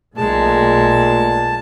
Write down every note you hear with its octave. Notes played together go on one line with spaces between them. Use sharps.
B1 A#2 G#3 A3 A5